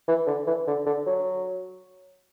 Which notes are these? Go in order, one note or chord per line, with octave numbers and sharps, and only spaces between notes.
E3
D3
E3
D3
D3
F#3